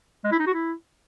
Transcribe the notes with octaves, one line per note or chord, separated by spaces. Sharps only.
G#3
E4
D#4
F#4
E4